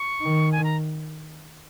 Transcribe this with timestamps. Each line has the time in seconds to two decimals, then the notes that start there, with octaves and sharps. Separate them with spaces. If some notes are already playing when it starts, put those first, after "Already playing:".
Already playing: C#6
0.21 D#3
0.52 G#5
0.64 A#5